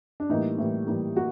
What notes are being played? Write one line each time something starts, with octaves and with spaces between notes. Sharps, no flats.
D4
A2 E3 G3 A#3 D#4
A2 E3 G3 A#3
A2 E3 G3 A#3
A#3 F#4